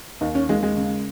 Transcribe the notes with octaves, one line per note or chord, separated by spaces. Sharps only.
D#2 D#4
C#4
D#2 G#3
G#3
C#3